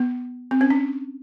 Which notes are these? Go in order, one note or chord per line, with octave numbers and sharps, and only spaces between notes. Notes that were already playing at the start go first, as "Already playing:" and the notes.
Already playing: B3
C4
C#4
D4